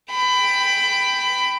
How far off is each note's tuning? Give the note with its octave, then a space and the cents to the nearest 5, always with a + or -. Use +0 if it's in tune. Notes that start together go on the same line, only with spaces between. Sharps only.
G5 +0 B5 +20